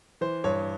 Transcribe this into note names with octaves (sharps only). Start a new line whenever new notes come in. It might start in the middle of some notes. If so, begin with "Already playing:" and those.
E3 C5
G2 C#5